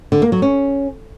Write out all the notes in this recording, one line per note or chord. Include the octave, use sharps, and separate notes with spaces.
D3
A#3
F#3
C#4